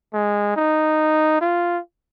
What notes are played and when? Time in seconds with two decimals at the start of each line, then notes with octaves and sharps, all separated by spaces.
0.14 G#3
0.56 D#4
1.41 F4